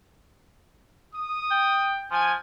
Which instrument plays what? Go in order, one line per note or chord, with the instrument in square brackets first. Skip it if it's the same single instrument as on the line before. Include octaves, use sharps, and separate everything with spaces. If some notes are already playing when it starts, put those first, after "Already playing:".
[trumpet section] D#6
[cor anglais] G5
[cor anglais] F3 [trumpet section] G#5